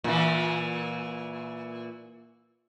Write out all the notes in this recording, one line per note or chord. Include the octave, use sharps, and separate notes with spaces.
A#2 E3